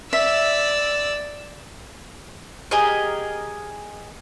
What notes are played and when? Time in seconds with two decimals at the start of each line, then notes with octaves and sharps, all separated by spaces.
0.13 D5 E5 E6
2.71 G4 G#4 A#4 D#5